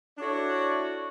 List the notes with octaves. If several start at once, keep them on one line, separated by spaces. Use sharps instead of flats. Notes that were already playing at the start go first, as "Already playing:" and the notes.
D4 E4 F#4 A4 C#5 D5